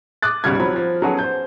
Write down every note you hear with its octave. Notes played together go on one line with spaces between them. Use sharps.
D6 D#6 F#6 A6
G#1 C#2 B2 G3 F6 G#6
F3 F#3 C4 B5
F3
F#3 B3 C#4 F#4 G#4 A4
C5 G6